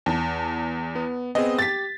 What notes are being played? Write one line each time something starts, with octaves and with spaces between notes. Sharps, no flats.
E2 A5
B3
B3 C4 G#4 D#5
G4 A6 B6